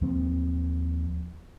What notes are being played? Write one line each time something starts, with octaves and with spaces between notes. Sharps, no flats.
D#2 F3 C4